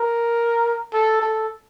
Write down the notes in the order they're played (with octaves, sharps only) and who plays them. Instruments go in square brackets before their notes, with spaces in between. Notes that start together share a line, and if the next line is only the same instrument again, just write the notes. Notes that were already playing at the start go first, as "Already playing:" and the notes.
Already playing: [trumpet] A#4
A4
A4